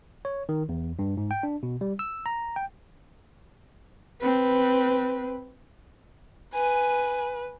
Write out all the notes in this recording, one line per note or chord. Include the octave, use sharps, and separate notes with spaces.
C#5
D#3
E2
G2
G#2
G5
D4
B2
G3
E6
A#5
G5
C4 B4
B4 G#5